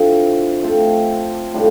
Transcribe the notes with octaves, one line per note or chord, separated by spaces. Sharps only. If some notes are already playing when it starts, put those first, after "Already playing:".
Already playing: D3 F3 C4 E4
A3 C4 F4 A4
A2 G3 D4 F4